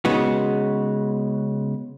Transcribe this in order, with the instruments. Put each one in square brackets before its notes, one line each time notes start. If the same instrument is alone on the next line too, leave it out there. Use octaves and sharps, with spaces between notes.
[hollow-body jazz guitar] C#3 G#3 B3 D#4 F#4